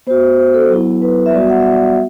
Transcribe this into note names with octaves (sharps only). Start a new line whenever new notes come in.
B3 F#4 C5
C5
A4
F#3 B3 E4
B4
E5
G3 B3 F#4 D5
F#5
E5
D5
E5